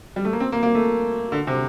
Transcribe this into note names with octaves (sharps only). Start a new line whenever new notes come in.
G3
A3
A#3
C4
A#3
A#3
A3
D3
C3